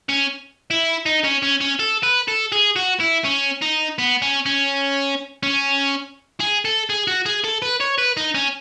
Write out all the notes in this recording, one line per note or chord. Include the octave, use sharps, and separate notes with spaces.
C#4
E4
D#4
C#4
C#4
C#4
A4
B4
A4
G#4
F#4
E4
C#4
D#4
B3
C#4
C#4
C#4
G#4
A4
G#4
F#4
G#4
A4
B4
C#5
B4
D#4
C#4